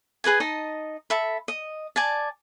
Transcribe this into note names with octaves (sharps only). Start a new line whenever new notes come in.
G#4 B4 D#5 G#5
D#4 D#5 A5
A4 E5 B5
D#5
D5 G#5 A5